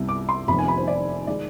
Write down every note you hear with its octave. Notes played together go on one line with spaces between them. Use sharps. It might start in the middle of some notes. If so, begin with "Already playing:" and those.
Already playing: C2 C3 G3 B3
D6
C6
F1 F2 C3 D#3 B3 B5
G#5
B5
C5
D5
D#3 G#3 D5